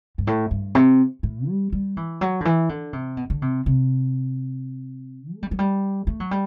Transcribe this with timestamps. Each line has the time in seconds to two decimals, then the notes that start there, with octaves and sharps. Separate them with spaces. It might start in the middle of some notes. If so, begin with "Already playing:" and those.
0.18 G2
0.27 A2
0.51 G2
0.75 C3
1.23 A2
1.48 G3
1.72 G3
1.97 E3
2.21 F#3
2.41 D3
2.45 E3
2.69 D3
2.93 C3
3.17 B2
3.30 D3
3.42 C3
3.66 C3
5.35 A3
5.43 G3
5.51 F#3
5.59 G3
6.07 A3
6.20 F#3
6.31 G3